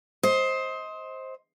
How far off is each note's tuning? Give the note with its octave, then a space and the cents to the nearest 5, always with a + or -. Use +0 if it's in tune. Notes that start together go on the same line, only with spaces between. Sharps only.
C5 +10 D#5 +25